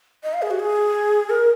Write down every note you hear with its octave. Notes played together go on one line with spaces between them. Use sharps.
D#5
F5
G#4
F#4
G#4
A#4